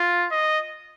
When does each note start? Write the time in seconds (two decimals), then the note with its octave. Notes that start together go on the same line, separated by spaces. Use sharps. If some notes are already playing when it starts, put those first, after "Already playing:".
Already playing: F4
0.32 D#5